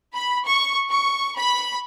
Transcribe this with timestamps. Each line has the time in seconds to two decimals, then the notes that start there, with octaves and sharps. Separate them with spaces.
0.13 B5
0.46 C#6
0.89 C#6
1.36 B5